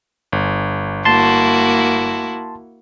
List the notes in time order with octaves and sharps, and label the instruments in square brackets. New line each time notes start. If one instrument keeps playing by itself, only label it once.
[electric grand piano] G1
[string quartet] A#3 E4 F#4 [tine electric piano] A5 C6